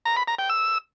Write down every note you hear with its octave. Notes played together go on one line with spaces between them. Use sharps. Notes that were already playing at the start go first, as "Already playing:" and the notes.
A#5
B5
A#5
G5
E6